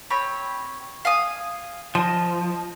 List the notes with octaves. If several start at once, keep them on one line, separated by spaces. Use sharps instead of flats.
C4 C#5 B5
F5 G#5 D#6
F3 D#5